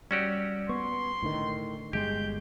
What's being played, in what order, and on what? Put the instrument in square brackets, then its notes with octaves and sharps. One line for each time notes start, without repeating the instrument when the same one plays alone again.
[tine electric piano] G3 D5 E6 [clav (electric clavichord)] C#4 F#4 G4
[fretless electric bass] B3 [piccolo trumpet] C6 [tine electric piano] C#6
[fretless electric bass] A2 D3 D#3
[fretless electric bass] G1 G#3 [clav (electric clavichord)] G4 [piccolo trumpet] G6